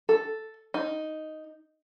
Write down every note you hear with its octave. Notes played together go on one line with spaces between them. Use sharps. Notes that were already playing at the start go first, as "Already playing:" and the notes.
A4
D#4